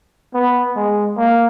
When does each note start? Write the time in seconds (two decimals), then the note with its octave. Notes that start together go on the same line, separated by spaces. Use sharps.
0.34 B3
0.76 G#3
1.17 A#3